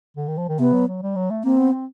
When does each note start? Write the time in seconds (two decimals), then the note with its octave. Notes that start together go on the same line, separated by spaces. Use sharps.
0.17 D3
0.28 D#3
0.37 F3
0.49 D#3
0.59 C3 B3
0.73 F#3
0.88 F#3
1.02 G3
1.15 F#3
1.30 A3
1.44 A#3 C4
1.58 B3
1.73 C4